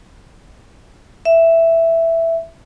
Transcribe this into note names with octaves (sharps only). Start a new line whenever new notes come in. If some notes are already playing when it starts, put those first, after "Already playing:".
E5